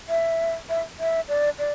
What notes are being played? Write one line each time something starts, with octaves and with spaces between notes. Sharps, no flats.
E5
E5
E5
D5
D5